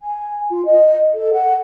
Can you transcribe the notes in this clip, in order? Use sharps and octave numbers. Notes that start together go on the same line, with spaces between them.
G#5
F4
D#5
A4
F#5